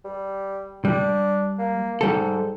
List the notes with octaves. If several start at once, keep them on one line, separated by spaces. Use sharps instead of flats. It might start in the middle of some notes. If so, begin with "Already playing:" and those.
G3
G3 D4
A#3
G#2 G3 A4